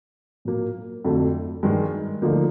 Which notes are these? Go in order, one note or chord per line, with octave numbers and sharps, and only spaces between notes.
A#2 F#3 A#3
F2 D3 F#3 A3
G2 D#3 G#3
D2 D3 F3 A#3 D#4